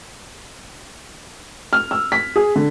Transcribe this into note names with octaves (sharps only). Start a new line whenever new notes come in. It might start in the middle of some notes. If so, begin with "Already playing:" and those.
F6
E6
B6
G#4
D3